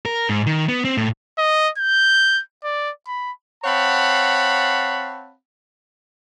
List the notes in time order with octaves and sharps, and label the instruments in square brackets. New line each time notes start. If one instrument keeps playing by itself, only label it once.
[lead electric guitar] A#4
G#2
D#3
B3
C4
A2
[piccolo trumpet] D#5
G6
D5
B5
[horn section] C4 C#5 F5 F#5 A5 B5